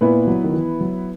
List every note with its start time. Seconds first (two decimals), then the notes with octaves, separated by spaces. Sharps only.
0.01 A#2 B3 E4 B4
0.27 F#3
0.44 D#3
0.53 E3
0.81 F#3